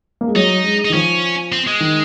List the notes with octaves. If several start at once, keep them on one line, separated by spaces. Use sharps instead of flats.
A#3
G#3
F#3 D#4
G#3
D#4
D#3
F3 C#4
C4
G#3
D#3